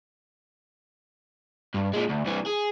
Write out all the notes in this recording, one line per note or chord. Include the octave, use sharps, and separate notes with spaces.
G2
A#2 G#3
D2
C2 E3
G#4